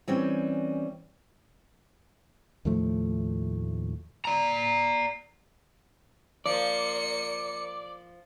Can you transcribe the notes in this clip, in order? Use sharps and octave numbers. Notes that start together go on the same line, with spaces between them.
E3 G3 C4 C#4
D#2 A2 F3 A3
D5 A#5
F3 A#3 D5 C#7